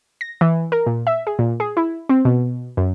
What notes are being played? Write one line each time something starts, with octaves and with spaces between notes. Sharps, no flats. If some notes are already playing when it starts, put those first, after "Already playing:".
A#6
E3
A#4
A#2
E5
G#4
A#2
G#4
E4
C4
B2
F#2